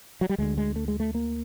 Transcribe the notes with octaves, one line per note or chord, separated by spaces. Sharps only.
F#3
G3
D2 D3 G#3
G#3
A3
G#3
A3
A#3